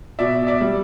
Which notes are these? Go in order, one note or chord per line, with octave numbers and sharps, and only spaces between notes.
B2 D5 E5
D5 E5
G3